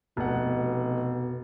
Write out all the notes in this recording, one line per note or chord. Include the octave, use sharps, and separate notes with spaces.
F1 B2 F#5